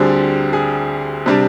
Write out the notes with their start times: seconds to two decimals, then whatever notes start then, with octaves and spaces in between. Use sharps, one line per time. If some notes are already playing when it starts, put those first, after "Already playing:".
Already playing: D2 D3 G3 C4 G#4
0.53 G#4
1.26 C3 G3 D4